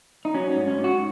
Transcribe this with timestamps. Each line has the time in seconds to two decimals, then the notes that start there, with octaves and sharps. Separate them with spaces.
0.25 D#4
0.35 F#3 C#4
0.51 C#4
0.56 G#2
0.68 C#4
0.78 G#2
0.84 F#4